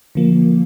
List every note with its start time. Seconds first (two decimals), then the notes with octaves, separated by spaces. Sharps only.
0.15 D3 F3 A#3